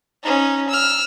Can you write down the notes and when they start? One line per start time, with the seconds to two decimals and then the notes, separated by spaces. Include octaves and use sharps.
0.23 C#4 D#4
0.69 E6 F6